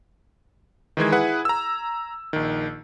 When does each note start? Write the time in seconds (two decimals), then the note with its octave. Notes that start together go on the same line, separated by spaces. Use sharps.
0.97 D#3 E3 G#3 G#6
1.12 E4 G#4 B4 F#5
1.45 A#5 E6
2.33 A#1 D#3